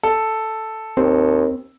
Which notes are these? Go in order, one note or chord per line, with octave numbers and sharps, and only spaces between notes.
A4
D#2 C4